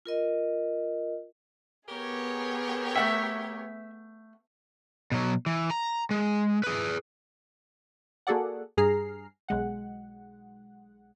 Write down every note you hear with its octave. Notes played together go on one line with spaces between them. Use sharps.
F4 A#4 D#5
B3 G4 G#4 A#4 C#5
A3 E5 F#5 G5
B2 F#3
E3
A#5
G#3
G#4 B4
A#3 F#4 G#4 A4 D5 F#5
G2 G#4 A#5 F6 C7
B1 G#3 F#5